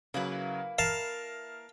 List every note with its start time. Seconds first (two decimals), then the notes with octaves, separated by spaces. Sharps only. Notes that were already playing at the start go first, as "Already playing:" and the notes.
0.14 C#3 F#3 A#3 E4 B4
0.78 A#4 F5 A5